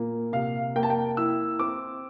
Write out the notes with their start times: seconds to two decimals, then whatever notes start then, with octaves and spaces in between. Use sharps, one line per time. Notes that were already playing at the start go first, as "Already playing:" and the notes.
Already playing: A#2 A#3
0.33 C3 F5
0.76 A#3 G5
0.83 A5
0.90 G5
1.17 E4 E6
1.59 C4 D6